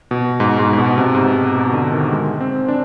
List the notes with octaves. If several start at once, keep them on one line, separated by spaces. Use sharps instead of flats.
B2
G#2
G#2
G#2
B2
C3
G#2
B2
B2
D3
D#3
G#3
C4
D4